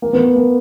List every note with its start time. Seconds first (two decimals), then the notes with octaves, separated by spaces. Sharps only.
0.02 A#3
0.13 B3
0.36 A#3